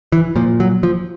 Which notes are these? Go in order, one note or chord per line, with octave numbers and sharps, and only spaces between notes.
E3
A#2 F3
F#3
F3